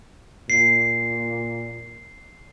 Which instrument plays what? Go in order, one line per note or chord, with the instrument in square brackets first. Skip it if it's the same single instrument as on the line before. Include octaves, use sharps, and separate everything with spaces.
[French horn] A#2 [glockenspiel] C7